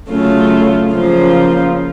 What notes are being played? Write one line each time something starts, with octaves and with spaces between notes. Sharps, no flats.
C#3 F#3 A3 C#4 F4
C#3 F3 A#3 F4